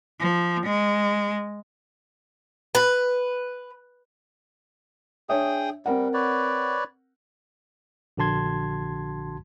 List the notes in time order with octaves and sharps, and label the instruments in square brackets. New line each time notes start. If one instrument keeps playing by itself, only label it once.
[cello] F3
G#3
[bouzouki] B4
[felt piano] D4 C#5 E5 [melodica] G#4 G5 D#6
[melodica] G3 [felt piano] C4 A#4 F#5
[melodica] B4 C#5 D5
[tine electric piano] A#1 D3 F#4 A5 C6 G#6